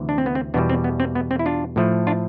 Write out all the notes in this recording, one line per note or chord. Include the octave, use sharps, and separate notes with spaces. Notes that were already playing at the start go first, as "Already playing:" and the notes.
Already playing: D2 C3 E3
D4
C4
B3
C4
E2 B2 G3 B3 D4
C4
B3
C4
B3
C4
E4
D4 F4
A2 F3 A3
D4 F4